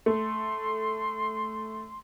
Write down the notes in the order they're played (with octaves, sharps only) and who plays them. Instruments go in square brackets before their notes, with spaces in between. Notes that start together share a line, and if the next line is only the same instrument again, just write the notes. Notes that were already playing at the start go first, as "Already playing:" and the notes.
[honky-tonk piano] A3 [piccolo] C6